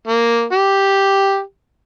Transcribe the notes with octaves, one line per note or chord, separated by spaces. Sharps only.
A#3
G4